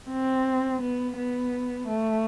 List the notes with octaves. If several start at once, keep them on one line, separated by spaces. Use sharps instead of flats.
C4
B3
B3
A3